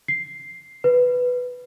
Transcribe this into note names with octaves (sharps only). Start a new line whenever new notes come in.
C7
B4